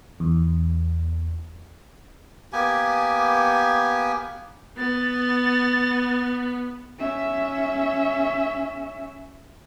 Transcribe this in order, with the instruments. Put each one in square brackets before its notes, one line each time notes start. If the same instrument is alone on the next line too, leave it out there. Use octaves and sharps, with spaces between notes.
[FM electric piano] E2
[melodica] A#3 B3 G4 G#5
[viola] B3 [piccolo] A6
[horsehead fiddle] C#4 E5